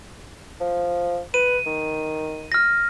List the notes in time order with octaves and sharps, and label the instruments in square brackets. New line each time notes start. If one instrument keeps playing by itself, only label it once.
[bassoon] F3
[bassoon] B4 [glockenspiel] D#7
[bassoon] D#3
[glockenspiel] F6 A#6